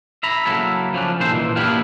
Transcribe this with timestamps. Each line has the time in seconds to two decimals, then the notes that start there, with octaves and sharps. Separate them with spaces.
0.23 E5 A#5 B5
0.45 C#3 F#3 A#3 E4 A4
0.94 F3 C#4 D4
1.19 C2 A#2 D#3 A4 C5
1.32 A#2 E3
1.56 A#3 B3 D4 E4 G4 F5